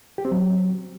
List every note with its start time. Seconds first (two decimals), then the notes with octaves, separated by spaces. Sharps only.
0.18 G4
0.25 C4
0.31 F#3